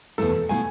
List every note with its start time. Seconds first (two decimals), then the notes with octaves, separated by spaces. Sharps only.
0.18 E2 B2 A3 E4 A4
0.49 B2 A3 E4 G#5